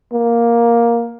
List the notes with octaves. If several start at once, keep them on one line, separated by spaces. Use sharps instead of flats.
A#3